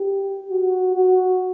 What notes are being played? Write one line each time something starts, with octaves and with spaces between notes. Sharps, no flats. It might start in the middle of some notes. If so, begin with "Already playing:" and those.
Already playing: G4
F#4
F#4